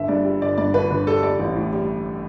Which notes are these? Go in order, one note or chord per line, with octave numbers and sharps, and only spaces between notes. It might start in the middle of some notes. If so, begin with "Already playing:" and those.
Already playing: G1 E5
G2 D5
G3
G1 D5
G2 D5
G1 B4
G1 B4
G3 A4
G3 D5
A1
A2
G3